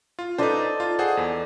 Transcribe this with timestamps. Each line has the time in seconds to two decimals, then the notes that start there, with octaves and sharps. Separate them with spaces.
0.19 F4
0.38 D#4 A4 B4 C5 D5 D#5
0.80 F4
0.99 G#4 C5 F#5
1.17 E2